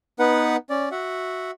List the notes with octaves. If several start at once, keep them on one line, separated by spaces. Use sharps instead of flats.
B3 D#4 B4 F#5
C#4 D5
F#4 E5 F#5